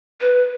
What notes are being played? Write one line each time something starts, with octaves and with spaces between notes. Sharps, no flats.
B4